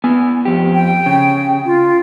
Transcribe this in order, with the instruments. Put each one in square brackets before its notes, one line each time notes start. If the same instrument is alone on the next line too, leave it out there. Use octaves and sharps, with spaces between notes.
[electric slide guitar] B3 G#5
F2 G4
[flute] G5
[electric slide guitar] C#3
[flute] F4